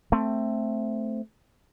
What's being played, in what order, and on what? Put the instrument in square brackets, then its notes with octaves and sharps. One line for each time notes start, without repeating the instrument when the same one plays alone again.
[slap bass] A3 C4